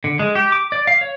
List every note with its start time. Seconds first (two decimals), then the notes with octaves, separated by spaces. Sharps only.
0.04 D3
0.19 G#3
0.35 G4
0.52 D6
0.72 D5
0.87 F5
1.01 C#5